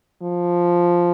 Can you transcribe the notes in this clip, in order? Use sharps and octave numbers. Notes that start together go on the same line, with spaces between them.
F3